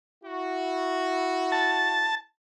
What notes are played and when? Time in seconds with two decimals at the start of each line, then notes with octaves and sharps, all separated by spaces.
0.24 E4 F#4
1.52 A5